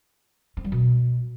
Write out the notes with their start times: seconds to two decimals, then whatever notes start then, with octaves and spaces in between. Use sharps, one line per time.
0.57 C4
0.64 G3
0.72 B2